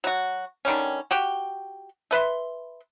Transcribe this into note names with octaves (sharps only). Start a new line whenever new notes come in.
F#3 F#4
D3 D#3 G3 C#4
F#4 G4 G5
A3 B4 E5 C6